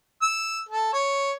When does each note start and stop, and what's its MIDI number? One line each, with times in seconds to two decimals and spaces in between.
0.22 0.60 88
0.69 0.91 69
0.93 1.32 73